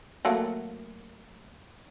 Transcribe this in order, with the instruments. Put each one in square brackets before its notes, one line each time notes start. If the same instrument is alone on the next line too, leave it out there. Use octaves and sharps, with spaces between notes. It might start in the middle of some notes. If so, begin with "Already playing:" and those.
[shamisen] F#3 A3 A#3